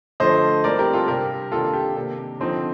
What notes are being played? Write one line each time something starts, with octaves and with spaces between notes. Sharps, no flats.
D3 F3 A3 C5 D#5
A2 G3 C4 A#4 D5
G4 A#4
F4 A4
C3 G3 D4 G4 A#4
C3 D#3 A#3 D4 F4 A4
G4
C3 D#3 A#3 D4
D3 F3 C4 D#4